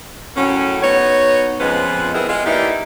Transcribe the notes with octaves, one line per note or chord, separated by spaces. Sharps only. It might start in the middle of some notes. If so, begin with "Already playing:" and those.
F#2 A2 F#3 C#4
B3 D#4 F#4 C#5
F2 F3 G#3 B3 C#4 B4
B3 C4 E4 G#4 A#4 B4
G#3 F4
E3 A#3 D#4 E4 G4 D5